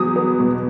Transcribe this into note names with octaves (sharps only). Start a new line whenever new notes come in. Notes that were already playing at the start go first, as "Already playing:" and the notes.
Already playing: E2 F#3 D#6
B3
B2